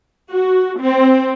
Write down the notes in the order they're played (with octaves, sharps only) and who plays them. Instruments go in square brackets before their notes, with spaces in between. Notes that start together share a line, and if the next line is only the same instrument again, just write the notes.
[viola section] F#4
C4